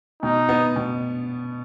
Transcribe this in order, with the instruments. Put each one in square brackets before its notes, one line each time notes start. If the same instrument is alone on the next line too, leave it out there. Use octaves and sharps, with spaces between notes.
[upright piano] B2 [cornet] D#4
[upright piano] B3
B2